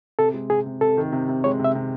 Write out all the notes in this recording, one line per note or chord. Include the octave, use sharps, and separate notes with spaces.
C3 A4
G#3
C3 G#4
C3
C3 A4
D#3
C3
C3
G#3 C#5
C3
E5
C3